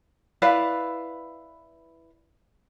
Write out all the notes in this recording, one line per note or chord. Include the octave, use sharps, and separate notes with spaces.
E4 B4 D5 F5